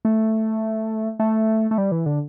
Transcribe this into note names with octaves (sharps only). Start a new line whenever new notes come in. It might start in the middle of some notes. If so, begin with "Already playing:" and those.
A3
A3
A3
G3
E3
D3